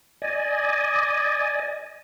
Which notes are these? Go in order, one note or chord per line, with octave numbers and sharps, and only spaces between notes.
D5 D#5 G#5